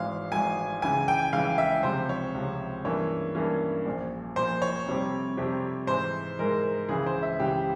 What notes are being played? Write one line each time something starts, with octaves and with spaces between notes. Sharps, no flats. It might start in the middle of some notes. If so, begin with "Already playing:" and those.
Already playing: G#1 G#2 E3 G#3 F5
G#1 G#2 E3 G#3 G#5
C#2 C#3 E3 G#5
G5
C#2 C#3 E3 F5
E5
C#2 C3 F3 C5
C#5
C#2 C3 F3
G2 E3 A#3 C#4 C#5
G2 E3 A#3 C#4
A#1 A#2 F3
A#1 A#2 F3 C5
C#5
F2 C3 G3 C4 G4
F2 C3 G3 C4 G4
G#2 E3 G#3 C5
G#2 E3 G#3 A#4
C#2 C#3 E3 G#4
C5
E5
C#2 C#3 E3 G4